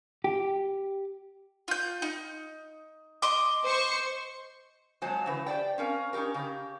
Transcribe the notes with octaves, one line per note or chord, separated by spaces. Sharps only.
G4
F4 G6
D#4
D#5 C6 D6
C5 C#6
F2 F#3 G#3 C5 G#5 A5
C#3 E3 B4
G4 C5 D5 G5
C4 C#4 A#4 F5
C#4 D#4 F4 G4 A#4
C#3 G4